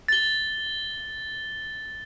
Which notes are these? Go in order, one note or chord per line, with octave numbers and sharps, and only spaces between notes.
A6 G7